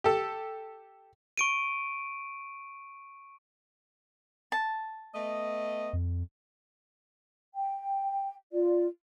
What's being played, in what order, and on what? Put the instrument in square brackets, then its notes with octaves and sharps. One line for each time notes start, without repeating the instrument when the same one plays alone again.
[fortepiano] G4 A4
[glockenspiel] C#6 D7 D#7
[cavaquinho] A5
[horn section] A3 B3 D#5
[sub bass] F2
[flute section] G5
F4 D5